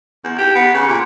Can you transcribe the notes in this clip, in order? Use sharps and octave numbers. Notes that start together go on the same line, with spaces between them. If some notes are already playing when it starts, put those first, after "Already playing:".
E2
G4
B3
C#3
A#2